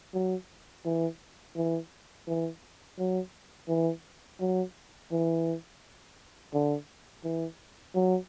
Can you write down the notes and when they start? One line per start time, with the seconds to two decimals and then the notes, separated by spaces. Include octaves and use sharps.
0.14 F#3
0.85 E3
1.56 E3
2.27 E3
2.98 F#3
3.69 E3
4.40 F#3
5.12 E3
6.53 D3
7.24 E3
7.95 F#3